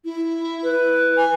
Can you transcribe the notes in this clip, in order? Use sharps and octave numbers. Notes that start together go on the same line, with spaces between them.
E4
B4
G#5